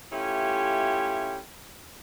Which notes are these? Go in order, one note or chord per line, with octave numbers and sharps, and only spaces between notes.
A3 C#4 E4 F4 G4